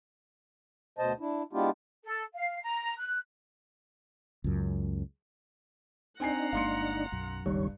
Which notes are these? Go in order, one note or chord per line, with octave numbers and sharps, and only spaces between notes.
D2 B2 C5 D#5 A5
D4 E4
G#3 B3 D4 E4 F4 G4
A4
F5
A#5
F#6
C#2 F#2
C4 D4 D#4 F#5 G#5 A#5 C7
G1 G#3 A#3 F5 C6 C#7
B1 F#2
F#1 C#2 G2 D#3 G3 C#5